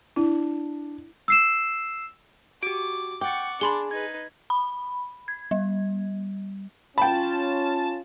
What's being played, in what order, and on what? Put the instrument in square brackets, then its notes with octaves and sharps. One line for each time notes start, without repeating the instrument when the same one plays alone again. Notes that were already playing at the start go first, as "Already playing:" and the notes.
[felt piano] D4 [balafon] E4
[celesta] E6 C7 E7
[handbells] F#4 G4 [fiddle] D6 [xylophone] D7
[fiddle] F#5 C#6 [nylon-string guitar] G5 [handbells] D6 A6
[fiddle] D4 [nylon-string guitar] G#4 [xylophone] B5 C6 G7
[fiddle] D#4 B4 [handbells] G#6
[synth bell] B5
G#6
G3
[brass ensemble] C#4 F4 [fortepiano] G5 B5 [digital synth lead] A5